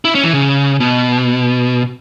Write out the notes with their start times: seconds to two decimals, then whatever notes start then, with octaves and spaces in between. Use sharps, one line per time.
0.05 E4
0.15 C#4
0.24 E3
0.33 C#3
0.80 B2